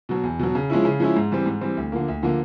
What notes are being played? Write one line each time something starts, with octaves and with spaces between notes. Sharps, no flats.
B2 F#3
E2
B2 F#3
C#3
F3 G#3 C#4 E4
C#3
F3 G#3 C#4 E4
G#2
E3 G3 C4
G#2
E3 G3 C4
D2
D3 F3 A#3
D2
D3 F3 A#3